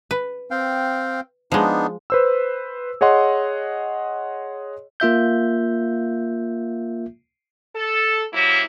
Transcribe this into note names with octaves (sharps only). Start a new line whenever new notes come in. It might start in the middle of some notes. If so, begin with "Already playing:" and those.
B4
C4 F5 G5
F3 G#3 B3 D4 D#4
B4 C5 E6
G#4 C#5 D#5 F#5 C6
A#3 F4 E5 G6
A4
C3 F#3 A#3 E4